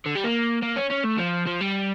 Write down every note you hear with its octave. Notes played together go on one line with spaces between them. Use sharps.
D3
G3
A#3
A#3
C#4
C#4
A3
F3
F3
G3